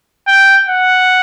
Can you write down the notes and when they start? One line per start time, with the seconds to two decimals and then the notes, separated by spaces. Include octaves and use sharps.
0.28 G5
0.69 F#5